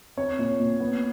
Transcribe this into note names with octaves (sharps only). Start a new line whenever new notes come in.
C4 C#5
A#2
A#2
B3